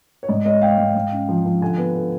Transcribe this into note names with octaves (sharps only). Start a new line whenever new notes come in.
C#5
G#2 D5
G#3 C#5 D#5
G#3 F5 G5
G#2
G#2
C#4
F3
F3
D3 F#5 G#5
B3
D3